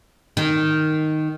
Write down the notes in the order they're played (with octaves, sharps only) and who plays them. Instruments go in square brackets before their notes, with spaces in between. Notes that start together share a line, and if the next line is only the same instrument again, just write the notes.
[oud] D#3